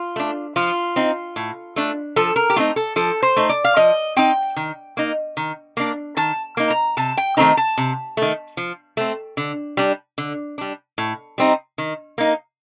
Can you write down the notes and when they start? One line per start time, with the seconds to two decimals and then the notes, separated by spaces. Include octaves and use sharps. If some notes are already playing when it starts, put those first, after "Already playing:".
Already playing: F4
0.16 A3 D4
0.56 F3 F4
0.96 C4 D#4
1.36 A2
1.76 A3 D4
2.16 F3 A4
2.36 A#4
2.50 G4
2.56 A3 C4 D#4 F4
2.76 A4
2.96 F3 A4
3.23 C5
3.36 A3 D#4
3.49 D5
3.64 F5
3.76 F3 D#5
4.16 C4 D#4 G5
4.56 D#3
4.97 A#3 D#4
5.37 D#3
5.77 A#3 D4
6.17 D#3 A5
6.57 A#3 D#4
6.70 A#5
6.97 C3 A5
7.17 G5
7.37 D#3 A3 C4 D#4 A#5
7.57 A5
7.78 C3
8.17 D#3 A3
8.57 F3
8.97 A3 C4
9.37 D3
9.77 G3 D4
10.18 D3
10.58 G3 D4
10.98 A2
11.38 G3 C4 D#4
11.78 D#3
12.18 A#3 D#4